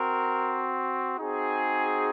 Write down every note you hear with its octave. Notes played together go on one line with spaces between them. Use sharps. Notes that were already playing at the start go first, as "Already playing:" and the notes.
Already playing: C4 F#4 A#4
C4 D#4 F#4 G#4